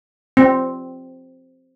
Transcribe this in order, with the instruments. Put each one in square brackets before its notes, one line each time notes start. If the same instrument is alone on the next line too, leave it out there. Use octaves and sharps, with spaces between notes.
[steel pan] C4